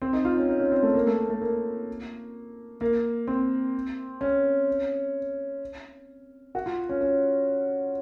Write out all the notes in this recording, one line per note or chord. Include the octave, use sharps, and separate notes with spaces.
C4
D#4
F4
C#4
D#4
C#4
C4
A3
A#3
A3
A3
A#3
A#3
C4
C#4
F#4
F4
C#4
C#4